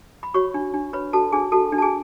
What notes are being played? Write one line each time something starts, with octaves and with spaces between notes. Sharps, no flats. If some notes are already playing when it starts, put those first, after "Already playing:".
B5
F#4 C#5 C#6
D4
D4
B4 C#5 B5
F#4 A4 A5
D4 G#4 G#5
F#4 A4 A5
D4
A5
G#4 G#5